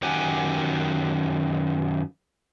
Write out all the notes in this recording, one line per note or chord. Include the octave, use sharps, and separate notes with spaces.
F#2 D#3 G4 F#5 G#5